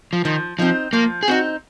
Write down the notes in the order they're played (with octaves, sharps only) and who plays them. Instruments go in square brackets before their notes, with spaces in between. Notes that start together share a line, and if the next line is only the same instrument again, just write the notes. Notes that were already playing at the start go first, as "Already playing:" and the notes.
[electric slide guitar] F3
[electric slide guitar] D#3 [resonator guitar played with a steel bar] F3
[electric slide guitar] F3 [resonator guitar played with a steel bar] C4 D#4
[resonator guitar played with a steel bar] F3 [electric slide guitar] A#3
[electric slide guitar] G#4
[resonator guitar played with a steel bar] C4 D#4 [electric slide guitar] F#4